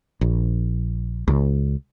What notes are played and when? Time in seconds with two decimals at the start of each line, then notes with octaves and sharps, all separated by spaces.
0.21 A#1
1.28 C#2